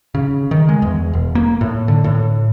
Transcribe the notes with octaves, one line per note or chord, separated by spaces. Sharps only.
C#3
D#3
G#3
E2
E1
A#3
A2
D3
A2